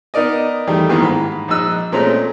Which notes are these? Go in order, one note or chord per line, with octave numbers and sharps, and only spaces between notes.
B3 D#4 A#4 D5 D#5
E2 D#3 G3 A3
G2 D#3 E3 A#3 B3
G#2 B5
A#1 D#4 D#5 E6 F#6
A#2 G#3 A3 C4 C#4 A#5